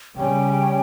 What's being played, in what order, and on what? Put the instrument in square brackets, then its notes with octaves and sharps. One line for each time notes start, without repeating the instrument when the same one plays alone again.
[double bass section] C#3 G3 C#4 [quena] G5